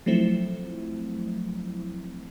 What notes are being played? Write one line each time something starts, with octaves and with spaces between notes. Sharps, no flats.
F3 F#3 A3 C4 E4